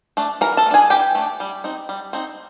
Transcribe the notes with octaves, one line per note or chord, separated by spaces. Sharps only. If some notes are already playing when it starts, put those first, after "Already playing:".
A3 D4
E3 A#4 A#5
A4 A5
A3
D4 G#4 G#5
E3 G4 G5
A3 D4
G3
C4 D#4
G3
C4 D#4